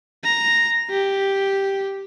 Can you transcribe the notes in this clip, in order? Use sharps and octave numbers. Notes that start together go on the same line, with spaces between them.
A#5
G4